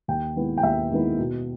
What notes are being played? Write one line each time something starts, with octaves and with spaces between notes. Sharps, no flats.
D#2 G5
D#3 G#3 B3 E4
G5
D#2 E5
D#3 G#3 B3 E4
B2